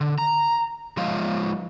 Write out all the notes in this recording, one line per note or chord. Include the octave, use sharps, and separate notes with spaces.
D3
A#5
F3 G#3 F4 C#5 D#5 F5